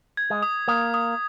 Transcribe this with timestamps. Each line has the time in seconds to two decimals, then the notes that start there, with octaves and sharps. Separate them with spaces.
0.17 G#6
0.30 G#3
0.42 D#6
0.68 A#3 D#6
0.94 D#6